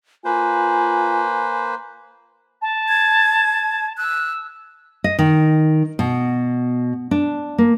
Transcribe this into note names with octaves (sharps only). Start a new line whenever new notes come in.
A#3 F4 B4 C5 G#5
A5
G#6
E6 F#6
D#5
D#3
B2
D4
A#3